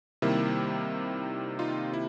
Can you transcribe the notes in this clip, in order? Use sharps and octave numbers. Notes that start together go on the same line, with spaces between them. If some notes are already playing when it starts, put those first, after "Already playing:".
C3 D#3 G3 A#3 E4
D#4 F4
E4